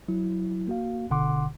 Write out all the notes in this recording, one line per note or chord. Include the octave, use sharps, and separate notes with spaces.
F#3 E4
A#3 F#4 F5
G1 B2 D3 F#5 C6 D6